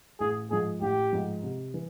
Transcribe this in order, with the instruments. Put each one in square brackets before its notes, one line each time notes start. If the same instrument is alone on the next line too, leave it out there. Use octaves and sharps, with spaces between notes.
[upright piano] A1 [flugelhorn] G#4
[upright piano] G#2 F3 [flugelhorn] G#4
[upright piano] A1 [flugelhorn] G4
[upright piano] G#2 F3
C3
E3